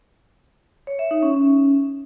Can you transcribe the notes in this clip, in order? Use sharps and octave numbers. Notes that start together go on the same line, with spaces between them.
C#5
E5
D#4
C#4
C#4